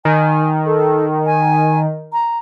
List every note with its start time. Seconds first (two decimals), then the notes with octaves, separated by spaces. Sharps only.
0.05 D#3 G#5
0.66 A4
1.26 G#5
2.13 A#5